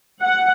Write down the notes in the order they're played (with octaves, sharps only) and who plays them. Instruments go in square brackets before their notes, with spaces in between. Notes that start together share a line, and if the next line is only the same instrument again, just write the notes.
[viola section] F#5